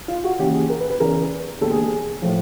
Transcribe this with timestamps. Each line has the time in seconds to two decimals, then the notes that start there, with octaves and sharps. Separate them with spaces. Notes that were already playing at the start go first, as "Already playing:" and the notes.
0.08 F4
0.24 F#4
0.39 D#2 C#3 E3 G4
0.54 G#4
0.70 A#4
0.80 B4
0.90 B4
1.00 E2 C#3 E3 A#4
1.61 E1 D#2 D3 A4
1.71 G#4
1.82 G#4
2.22 A2 F3